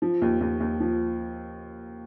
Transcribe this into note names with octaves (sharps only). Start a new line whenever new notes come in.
F3
D#2
D#2
D#2
F3